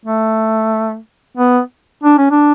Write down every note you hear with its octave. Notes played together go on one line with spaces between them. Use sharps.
A3
B3
D4
C#4
D4